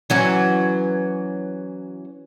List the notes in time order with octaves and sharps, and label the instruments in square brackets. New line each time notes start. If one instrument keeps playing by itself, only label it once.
[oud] E3 F#3 C#4